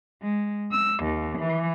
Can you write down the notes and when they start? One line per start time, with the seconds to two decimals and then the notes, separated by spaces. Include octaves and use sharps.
0.22 G#3
0.71 E6
1.04 D#2
1.39 E3